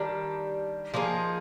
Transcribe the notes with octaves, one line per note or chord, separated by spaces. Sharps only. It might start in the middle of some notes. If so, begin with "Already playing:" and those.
Already playing: D#3 G3 D4
F3 A#3 D#4 G#4